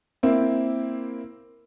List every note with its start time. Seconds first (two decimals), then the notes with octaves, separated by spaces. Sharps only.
0.23 A#3 C4 E4